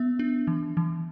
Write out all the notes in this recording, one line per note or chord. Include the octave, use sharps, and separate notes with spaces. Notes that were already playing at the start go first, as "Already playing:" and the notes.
Already playing: B3 E5
D4
E3
E3